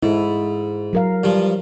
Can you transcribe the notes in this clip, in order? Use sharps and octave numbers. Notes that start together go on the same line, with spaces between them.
G#2 E4 A4
F#3 A#4 F5
G2 F3